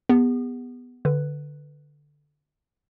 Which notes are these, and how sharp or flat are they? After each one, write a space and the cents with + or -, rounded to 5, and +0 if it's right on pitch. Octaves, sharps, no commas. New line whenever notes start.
B3 +0 G#4 -45
D3 +0 B4 +0